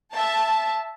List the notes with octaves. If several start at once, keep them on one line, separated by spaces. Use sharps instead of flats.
E5 A5